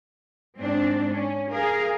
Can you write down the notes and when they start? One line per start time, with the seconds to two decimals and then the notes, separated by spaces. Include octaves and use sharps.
0.58 G#2 C4 D4
1.13 C#4
1.52 G#4 A#4 F5